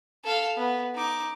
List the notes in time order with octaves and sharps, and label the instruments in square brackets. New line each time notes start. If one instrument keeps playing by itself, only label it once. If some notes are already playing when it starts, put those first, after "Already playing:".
[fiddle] A4 F5
B3
D#4 D6